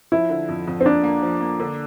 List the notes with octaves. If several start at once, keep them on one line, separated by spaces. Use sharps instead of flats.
F3 E4
D3
F2
F2
C4
A#3 D4
A#3
F3
A#3
D3